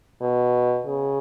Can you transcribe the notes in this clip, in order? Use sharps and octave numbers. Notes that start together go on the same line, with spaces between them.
B2
C#3